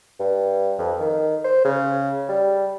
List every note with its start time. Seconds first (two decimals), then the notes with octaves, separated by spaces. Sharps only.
0.20 G2
0.79 F2
1.00 D#3
1.44 C5
1.65 C#3
2.29 G3